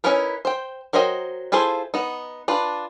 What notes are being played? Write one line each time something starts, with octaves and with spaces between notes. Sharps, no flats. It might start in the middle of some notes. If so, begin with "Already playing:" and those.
C#4 D#4 E4 A#4 B4
C5 G5
F#3 A#4 C5 D#5 G5
E4 F4 G#4 A4 C5
B3 D#4
D4 F4 B4